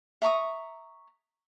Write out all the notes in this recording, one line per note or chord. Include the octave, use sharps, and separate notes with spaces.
E5 A#5 C#6 D#6